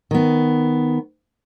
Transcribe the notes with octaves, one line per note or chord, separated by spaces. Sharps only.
D#3 B3